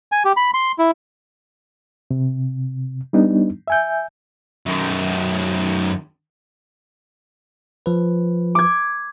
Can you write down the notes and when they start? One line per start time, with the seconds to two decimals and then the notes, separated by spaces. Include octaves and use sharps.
0.12 G#5
0.25 G4
0.37 B5
0.54 C6
0.79 E4
2.11 C3
3.13 G3 B3 D4 D#4
3.68 E5 G#5 G6
4.66 F#2 D#3
7.86 F3 B4
8.55 D6 G#6